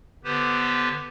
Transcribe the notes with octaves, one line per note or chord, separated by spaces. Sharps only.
D3 B3 G4 B4 C5